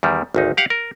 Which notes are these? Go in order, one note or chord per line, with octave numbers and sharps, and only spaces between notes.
E2 D#3 G3
G#1 D2 D#4
G4 F5 F#5
A#4